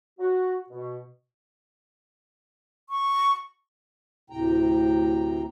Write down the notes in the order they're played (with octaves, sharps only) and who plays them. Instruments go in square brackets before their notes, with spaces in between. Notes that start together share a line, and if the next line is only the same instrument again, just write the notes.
[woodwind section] F#4
B2
[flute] C#6
[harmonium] D2 A2 C3 G5 A#5